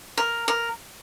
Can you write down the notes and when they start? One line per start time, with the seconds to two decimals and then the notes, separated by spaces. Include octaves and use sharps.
0.18 A#4
0.48 A#4